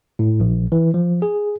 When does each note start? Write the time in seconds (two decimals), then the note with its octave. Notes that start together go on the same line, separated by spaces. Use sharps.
0.19 A2
0.40 A#1
0.72 E3
0.94 F3
1.22 G#4